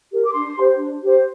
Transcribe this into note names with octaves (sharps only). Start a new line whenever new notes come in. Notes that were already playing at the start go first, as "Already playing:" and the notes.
G4 A#4
D6
D4 C6
G4 C5
D4
G4 C5